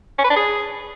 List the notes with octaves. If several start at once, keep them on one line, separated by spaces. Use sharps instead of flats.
C#4
B4
D4
G#4